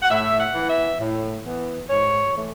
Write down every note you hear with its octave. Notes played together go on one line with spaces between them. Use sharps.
F#5
A2 E5
F#5
E3 B3
E5
A2
E3 B3
G#2 C#5
E3 A3